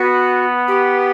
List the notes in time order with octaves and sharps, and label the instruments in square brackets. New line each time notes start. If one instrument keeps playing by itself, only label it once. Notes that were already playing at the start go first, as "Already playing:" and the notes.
Already playing: [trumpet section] B3 [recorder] F#4
[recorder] G4